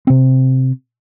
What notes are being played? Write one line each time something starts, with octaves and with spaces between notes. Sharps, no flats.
C3 C4